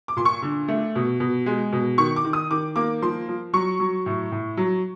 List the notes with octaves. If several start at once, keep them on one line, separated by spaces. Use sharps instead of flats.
D6
A#2 C6
C#6
D3
A3
B2
B2
G#3
B2
D#3 C#6
D6
D#3
D#6
D#3 D6
A#3 D6
F3 C6
F3
F#3 C#6
F#3
A2
A2
F#3